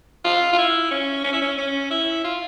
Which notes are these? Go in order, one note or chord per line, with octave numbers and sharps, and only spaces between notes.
F4
F4
E4
C#4
C#4
E4
C#4
C#4
E4
F4